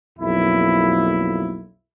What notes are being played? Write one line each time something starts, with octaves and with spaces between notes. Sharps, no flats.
B1 F2 A#3 E4